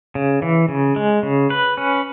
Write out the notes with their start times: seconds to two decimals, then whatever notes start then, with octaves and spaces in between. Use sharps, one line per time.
0.15 C#3
0.42 E3
0.69 C#3
0.96 G#3
1.23 C#3
1.50 B4
1.77 C#4